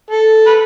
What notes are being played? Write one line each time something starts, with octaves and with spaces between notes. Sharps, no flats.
A4
B4